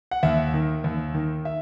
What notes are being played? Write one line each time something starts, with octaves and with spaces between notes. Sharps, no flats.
F#5
D#2 E5
D#3
D#2
D#3
E5